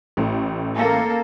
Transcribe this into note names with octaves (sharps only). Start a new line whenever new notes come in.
A1 A3
A#3 A4